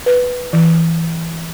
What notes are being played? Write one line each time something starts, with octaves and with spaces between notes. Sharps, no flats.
B4
E3